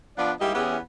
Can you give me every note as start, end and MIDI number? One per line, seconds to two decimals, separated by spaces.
0.18 0.33 53
0.18 0.33 59
0.18 0.33 62
0.18 0.33 65
0.18 0.33 74
0.41 0.54 44
0.41 0.54 55
0.41 0.54 58
0.41 0.54 64
0.41 0.54 67
0.41 0.54 75
0.55 0.77 40
0.55 0.77 59
0.55 0.77 61
0.55 0.77 64
0.55 0.77 67
0.55 0.77 68